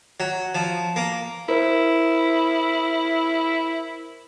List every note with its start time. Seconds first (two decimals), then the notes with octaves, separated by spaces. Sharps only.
0.20 F#3
0.55 F3
0.96 A#3
1.49 E4 A#4 C5